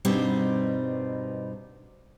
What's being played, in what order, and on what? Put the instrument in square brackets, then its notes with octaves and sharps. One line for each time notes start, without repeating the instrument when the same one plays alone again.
[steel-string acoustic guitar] G2 B2 G3 C4 D#4